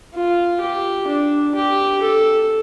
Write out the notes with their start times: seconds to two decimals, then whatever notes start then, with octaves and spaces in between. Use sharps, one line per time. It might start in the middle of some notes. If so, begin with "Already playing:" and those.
0.14 F4
0.61 G4
1.08 D4
1.55 G4
2.02 A4